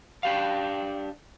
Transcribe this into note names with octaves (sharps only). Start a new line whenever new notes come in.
D4 G4 F5